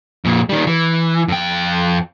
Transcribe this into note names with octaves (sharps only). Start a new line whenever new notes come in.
F2 A#2
D#3 G3
E3
F2 G5